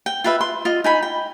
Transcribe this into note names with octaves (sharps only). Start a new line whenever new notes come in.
G5
F4 B4 E5
C6
F4 D#5
D#4 G#5 B5
G5